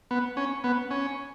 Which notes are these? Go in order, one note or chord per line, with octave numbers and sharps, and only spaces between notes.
B3
C#4
B3
C#4